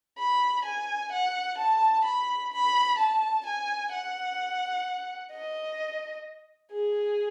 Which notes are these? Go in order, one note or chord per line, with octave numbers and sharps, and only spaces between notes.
B5
G#5
F#5
A5
B5
B5
A5
G#5
F#5
D#5
G#4